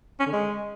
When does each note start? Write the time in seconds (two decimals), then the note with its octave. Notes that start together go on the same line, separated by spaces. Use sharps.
0.20 C#4
0.26 D3
0.33 G#3